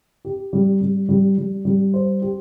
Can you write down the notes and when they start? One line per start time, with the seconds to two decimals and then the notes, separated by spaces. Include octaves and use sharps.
0.25 G4
0.53 G3
0.81 G3
1.09 G3
1.38 G3
1.65 G3
1.94 C5
2.22 G4